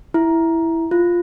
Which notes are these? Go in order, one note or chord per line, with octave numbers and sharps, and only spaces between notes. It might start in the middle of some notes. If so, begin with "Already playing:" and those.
E4
F4